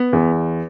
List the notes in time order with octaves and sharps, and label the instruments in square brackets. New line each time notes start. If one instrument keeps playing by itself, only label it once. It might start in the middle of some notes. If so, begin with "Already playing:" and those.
Already playing: [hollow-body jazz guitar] B3
[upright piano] E2